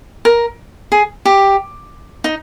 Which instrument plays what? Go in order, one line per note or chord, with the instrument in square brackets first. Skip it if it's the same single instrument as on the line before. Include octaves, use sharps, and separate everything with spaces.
[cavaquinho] A#4
G#4
G4
D#4